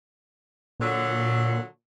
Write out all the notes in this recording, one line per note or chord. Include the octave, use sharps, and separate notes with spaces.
A#2 D3 F#3